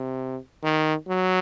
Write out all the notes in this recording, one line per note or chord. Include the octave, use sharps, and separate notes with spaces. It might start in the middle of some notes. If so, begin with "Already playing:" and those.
Already playing: C3
D#3
F#3